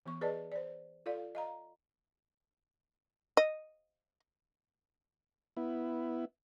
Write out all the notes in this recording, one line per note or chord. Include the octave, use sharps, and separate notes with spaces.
E3 B3 C#6
G#4 B4 D5 D#5 A5
C5 D5
F4 A4 D5 F5
D#5 F5 A#5
D#5
B3 E4